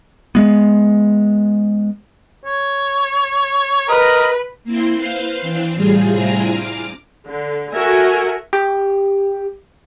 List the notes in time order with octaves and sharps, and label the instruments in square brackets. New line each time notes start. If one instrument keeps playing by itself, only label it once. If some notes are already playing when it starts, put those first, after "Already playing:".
[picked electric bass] G#3 B3
[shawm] C#5
[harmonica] A#4 [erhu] B4 [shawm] D#5
[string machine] A#3 C4 E4 C6
B4 C5 F5
E3 C4 D4
A2 C3 G3 F4 G#4
C4 D4 E4 F4 G#5 A#5
D6 F6
[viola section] D3
F#4 A4 A#4 E5 G#5
[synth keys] G4